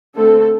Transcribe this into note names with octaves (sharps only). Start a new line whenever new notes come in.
D3 A3 C4 A4